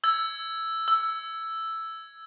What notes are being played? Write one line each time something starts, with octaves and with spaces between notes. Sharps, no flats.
E6 G#6
E6